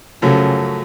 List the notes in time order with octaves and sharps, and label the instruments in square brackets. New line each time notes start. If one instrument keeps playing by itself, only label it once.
[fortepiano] F#2 F3 A3 C#4 F#4 [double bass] C#3